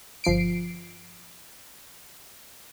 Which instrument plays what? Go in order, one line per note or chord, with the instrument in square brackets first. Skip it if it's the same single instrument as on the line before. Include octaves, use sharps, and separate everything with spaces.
[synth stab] G1 F3 C7 D7